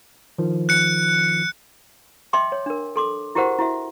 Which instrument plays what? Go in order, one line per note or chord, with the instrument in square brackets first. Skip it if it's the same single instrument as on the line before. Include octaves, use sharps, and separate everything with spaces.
[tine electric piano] D#3 F3
[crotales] F#6 C#7
[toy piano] D#5 E5 G5 C6 D6
C#5
D4 A#4
A4 C6 D6
E4 F#4 G4 A#4 C5 F#5
E4 F#4 E5